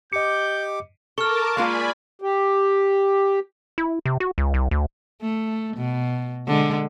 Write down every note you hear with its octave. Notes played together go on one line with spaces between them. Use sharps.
G4 D#5 D6 G6 C#7
A4 A#4 A5 C#6 D6 F6
G#3 A#3 F4 D5 G#5 B5
G4
E4
C3
F#4
C#2
C2
D2
A3
B2
D3 G#3